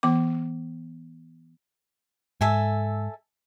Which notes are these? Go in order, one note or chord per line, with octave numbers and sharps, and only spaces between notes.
E3 B3 D6
G#2 A4 E5 G#5